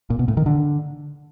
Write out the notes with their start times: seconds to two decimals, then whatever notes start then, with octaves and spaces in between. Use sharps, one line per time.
0.10 A#2
0.19 B2
0.28 A2
0.37 D#3
0.46 D3